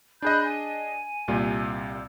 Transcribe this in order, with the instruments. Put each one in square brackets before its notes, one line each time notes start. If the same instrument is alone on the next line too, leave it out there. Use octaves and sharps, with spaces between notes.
[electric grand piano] D4 G#4 D#5 [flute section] B5 F#6 G6
[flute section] G#5
[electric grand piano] C2 A#2 G3